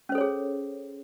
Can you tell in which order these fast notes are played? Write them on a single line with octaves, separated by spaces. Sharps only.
C#4 C5 A4 C#5 G#4